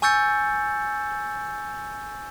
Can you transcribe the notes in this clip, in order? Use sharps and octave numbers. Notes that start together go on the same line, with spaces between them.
G#5 C#6 E6 G6 A6 C#7